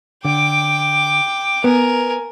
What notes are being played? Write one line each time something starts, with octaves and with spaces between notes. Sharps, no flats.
D3 G5 D6
B3 A#4 G#5